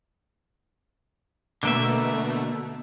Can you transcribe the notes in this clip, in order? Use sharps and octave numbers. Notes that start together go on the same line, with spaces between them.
B2 D3 A3 A#3 E5